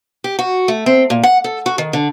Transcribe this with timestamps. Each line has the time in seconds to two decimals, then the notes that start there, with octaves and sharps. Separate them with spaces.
0.24 G4
0.39 F#4
0.68 A3
0.86 C4
1.10 A#2
1.23 F#5
1.44 A4
1.66 F#4
1.78 D#3
1.93 D3